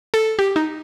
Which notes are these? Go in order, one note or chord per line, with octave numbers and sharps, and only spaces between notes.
A4
G4
D#4